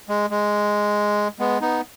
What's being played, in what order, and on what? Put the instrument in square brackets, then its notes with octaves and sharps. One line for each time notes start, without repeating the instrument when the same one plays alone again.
[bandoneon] G#3
G#3
G#3 B3
B3 D#4